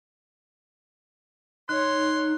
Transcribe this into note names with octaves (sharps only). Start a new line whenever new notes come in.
D#4 C#5 C6 F#6